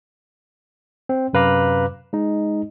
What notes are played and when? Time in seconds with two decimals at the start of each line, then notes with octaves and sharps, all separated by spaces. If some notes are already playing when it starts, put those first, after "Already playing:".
1.09 C4
1.33 F#2 C3 B4 F5 A#5 D6
2.13 G#3 D#4